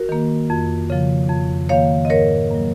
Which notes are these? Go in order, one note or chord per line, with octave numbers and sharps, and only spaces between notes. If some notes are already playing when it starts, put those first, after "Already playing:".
Already playing: F#4 A#4
D#3 A#3
F2
C#3 F3
F2
D#3 A#3 C#5 F5
D#5
G#2 A#4 C#5
F#3 A#3